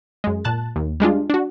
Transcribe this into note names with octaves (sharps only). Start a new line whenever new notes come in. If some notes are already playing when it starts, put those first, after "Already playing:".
F#2 G#3
A#2 A5 F#6 A6
D#2
G3 G#3 D4 F4
D4 F#4